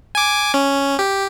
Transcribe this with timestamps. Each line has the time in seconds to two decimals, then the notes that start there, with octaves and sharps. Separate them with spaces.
0.15 G#5 D6
0.54 C#4
0.99 G4